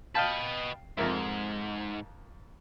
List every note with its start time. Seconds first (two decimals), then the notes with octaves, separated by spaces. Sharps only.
0.15 B4 D#5 F5 G5 A5
0.97 F2 G#2 A#4 E5